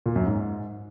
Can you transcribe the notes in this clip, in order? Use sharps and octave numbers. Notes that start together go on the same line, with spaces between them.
A#2
F#2
G#2